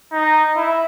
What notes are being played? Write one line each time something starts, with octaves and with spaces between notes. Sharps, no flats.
D#4
E4